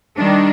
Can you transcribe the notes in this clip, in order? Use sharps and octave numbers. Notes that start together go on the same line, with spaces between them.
D#3 G3 D4